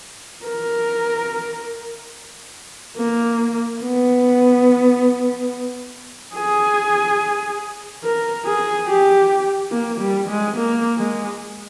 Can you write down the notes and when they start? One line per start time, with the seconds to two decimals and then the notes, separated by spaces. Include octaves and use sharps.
0.45 A#4
2.97 A#3
3.82 B3
6.34 G#4
8.04 A#4
8.46 G#4
8.88 G4
9.71 A#3
10.00 G3
10.28 G#3
10.56 A#3
10.98 G#3